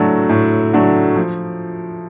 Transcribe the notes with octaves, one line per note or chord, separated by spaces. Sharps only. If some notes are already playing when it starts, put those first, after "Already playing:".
Already playing: A2 F#3 A3 D4 F#4
A2
F#3 A3 D4 F#4
F3